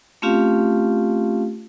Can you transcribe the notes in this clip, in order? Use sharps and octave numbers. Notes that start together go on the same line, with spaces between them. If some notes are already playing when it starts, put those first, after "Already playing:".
A3 C4 C#4 F4 G4 F5